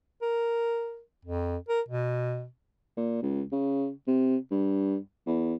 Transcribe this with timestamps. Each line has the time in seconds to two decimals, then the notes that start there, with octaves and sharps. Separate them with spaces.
0.22 A#4
1.25 F2
1.69 A#4
1.88 B2
2.97 A#2
3.22 C#2
3.52 C#3
4.07 C3
4.51 G2
5.27 E2